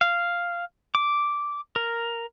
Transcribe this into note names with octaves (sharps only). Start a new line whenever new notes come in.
F5
D6
A#4